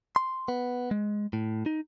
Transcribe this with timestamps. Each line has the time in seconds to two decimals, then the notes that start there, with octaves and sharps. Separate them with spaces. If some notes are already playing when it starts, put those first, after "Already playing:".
0.16 C6
0.48 B3
0.91 G#3
1.33 A2
1.66 D#4